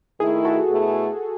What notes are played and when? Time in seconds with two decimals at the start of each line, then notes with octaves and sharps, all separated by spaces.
0.20 D#3 A3 E4 G#4
0.45 F#4 A4
0.69 B2 A3 E4 G#4